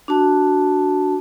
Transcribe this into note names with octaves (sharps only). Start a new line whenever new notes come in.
D4 F#4 A5